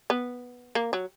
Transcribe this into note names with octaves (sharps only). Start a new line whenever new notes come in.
B3
A#3
F#3